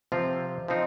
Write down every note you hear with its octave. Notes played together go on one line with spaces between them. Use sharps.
C3 F3 C4 F4
F3 C4 D#4